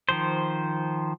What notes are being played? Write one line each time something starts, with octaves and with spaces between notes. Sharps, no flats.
D#3 F3 C5